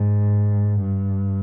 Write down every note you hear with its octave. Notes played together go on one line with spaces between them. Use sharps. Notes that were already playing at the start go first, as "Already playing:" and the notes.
Already playing: G#2
G2